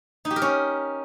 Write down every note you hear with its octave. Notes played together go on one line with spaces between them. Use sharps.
D#4
G4
A#4
C#4